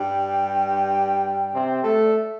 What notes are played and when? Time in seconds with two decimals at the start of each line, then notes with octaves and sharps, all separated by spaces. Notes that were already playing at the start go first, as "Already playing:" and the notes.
Already playing: G2 G3 G5
1.53 C3 C4
1.83 A3 A4
2.03 D5
2.13 E5